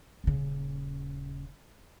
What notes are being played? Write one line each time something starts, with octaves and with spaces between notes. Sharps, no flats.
D#1 C#3